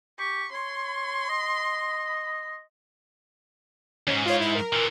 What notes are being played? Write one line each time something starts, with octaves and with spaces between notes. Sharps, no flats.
G4 C#6
C#5 C6
D#5
E2 G#2 C#4
F4 C#5
E4
A#4
A#2 E3